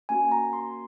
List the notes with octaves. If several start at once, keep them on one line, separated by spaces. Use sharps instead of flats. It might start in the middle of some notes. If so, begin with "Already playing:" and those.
A#3 C#4 F#4 G#5
A#5
C6